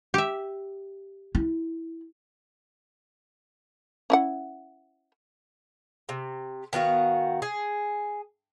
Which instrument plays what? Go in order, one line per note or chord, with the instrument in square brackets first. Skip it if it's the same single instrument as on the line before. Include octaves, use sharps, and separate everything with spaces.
[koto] G4 E5
[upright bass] E4
[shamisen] C#4 E4 F#5
[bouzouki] C3
D#3 B3 F#4 F5
G#4